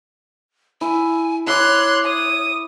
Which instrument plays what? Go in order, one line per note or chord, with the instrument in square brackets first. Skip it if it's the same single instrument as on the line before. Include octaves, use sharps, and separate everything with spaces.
[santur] E4 [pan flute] G#5
[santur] E4 E5 D6 [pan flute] C#5 [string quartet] C6 F#6
[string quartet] D#6